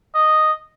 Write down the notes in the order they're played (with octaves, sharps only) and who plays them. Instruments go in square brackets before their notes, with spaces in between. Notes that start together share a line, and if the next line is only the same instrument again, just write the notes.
[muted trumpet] D#5